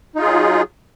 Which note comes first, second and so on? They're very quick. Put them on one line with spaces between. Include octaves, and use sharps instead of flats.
D#4 F4 G#4 F#3